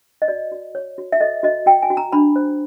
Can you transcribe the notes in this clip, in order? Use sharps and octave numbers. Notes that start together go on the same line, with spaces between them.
D#5
F#4 D5
F#4
C#5
F#4
E5
A4 D#5
F#4 D#5
F#4 G5
G#5
F#4
A#5
D4 B5
C5